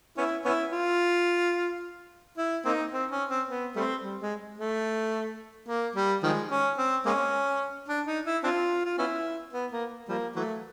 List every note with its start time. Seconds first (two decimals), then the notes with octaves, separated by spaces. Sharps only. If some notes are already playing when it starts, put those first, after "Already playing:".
0.18 B3 C#4 E4
0.45 B3 C#4 E4
0.72 F4
2.38 E4
2.65 A#3 C4 D#4
2.93 C4
3.11 C#4
3.30 C4
3.48 B3
3.76 G3 A3 C4
4.03 G3
4.21 G#3
4.58 A3
5.68 A#3
5.95 G3
6.23 D#3 F3 G#3
6.51 C#4
6.78 C4
7.06 G#3 A#3 C#4
7.88 D4
8.07 D#4
8.25 E4
8.43 C4 D4 F4
8.85 F4
8.98 B3 C#4 E4
9.53 B3
9.72 A#3
10.09 F3 G3 A#3
10.36 E3 F#3 A3